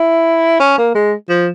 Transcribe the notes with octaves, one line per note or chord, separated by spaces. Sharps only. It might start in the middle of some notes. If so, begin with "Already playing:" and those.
Already playing: E4
C#4
A#3
G#3
F3